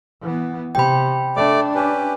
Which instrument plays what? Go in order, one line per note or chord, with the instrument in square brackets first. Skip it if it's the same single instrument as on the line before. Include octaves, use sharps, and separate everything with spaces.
[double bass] E3 B3
[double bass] C3 [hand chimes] G5 B5
[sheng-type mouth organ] A3 D5 D6 [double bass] D4
[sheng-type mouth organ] C#4 G4 B4